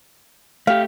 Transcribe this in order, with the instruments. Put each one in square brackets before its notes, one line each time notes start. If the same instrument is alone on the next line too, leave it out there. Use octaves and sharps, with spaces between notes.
[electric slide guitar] A3 G4 [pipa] F5